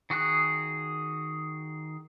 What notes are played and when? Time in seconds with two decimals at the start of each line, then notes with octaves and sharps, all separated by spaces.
0.10 D#3 F#4 G#4 F#6